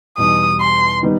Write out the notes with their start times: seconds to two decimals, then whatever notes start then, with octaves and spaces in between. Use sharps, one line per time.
0.18 E2 B2 G3 D#4 D#6
0.61 C6
1.03 D#3 G3 B3 D#4